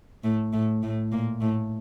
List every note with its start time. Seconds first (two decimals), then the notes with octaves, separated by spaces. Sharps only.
0.24 A2 A3
0.53 A2 A3
0.83 A2 A3
1.12 A#2 A#3
1.40 A2 A3